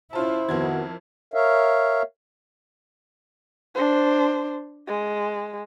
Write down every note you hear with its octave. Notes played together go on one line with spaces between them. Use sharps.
C#4 E4 F4 C5 A5
F2 D#3 B3 F#4 A#4 G#6
A#4 C#5 E5 F5
D4 C5
G#3